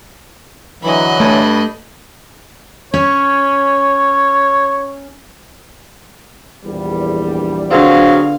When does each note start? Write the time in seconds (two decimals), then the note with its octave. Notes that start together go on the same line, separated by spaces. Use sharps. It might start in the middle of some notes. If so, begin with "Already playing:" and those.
0.83 D3 E3 F#3 D#5 B5
1.20 G2 A3
2.94 C#4 C#5
6.65 A#1 E2 G3
7.71 D3 F#3 B3 C4 F4 G#4 F5